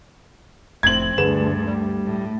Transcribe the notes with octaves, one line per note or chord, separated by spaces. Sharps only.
F1 A2 C4 G#6 F#7
D2 G2 D3 G#4 B4 E7
G3 A3
A2